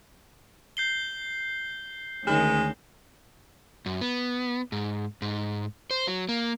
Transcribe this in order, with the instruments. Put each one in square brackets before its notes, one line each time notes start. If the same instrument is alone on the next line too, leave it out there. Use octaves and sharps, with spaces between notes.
[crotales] G6 C7 G7
[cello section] D2 D#3 C#4 [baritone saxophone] G#3
[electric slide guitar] F#2
B3
G#2
G#2
C5
F#3
A#3